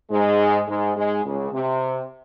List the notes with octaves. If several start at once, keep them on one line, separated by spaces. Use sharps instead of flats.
G#2 G#3
G#2 G#3
G#2 G#3
C#2 C#3
C3